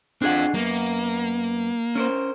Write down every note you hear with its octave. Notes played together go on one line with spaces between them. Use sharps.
C4 D4 F4 G#4 F#5
F#2 A#3 B3
C#4 A#4 C5